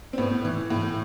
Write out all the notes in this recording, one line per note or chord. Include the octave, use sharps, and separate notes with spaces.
C4
A2 B3
E3
A2